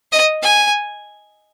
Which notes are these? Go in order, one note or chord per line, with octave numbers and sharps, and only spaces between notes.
D#5
G#5